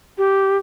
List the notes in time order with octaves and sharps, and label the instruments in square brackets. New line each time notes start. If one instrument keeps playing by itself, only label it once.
[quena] G4